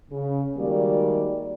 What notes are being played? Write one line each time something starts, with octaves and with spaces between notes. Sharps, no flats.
C#3
D#3 G3 G#3 A#3 F#4 D5